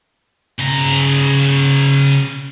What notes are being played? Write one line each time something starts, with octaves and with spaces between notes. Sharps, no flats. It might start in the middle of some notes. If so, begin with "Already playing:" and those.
C#3 A#5